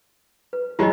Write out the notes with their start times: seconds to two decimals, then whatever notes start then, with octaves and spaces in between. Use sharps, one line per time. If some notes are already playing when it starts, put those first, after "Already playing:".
0.53 B4
0.79 E3 F#3 G#3 F4 G4 D#5